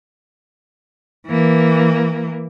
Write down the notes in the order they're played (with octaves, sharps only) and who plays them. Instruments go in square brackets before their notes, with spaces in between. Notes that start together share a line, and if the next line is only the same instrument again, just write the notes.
[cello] E3 A#3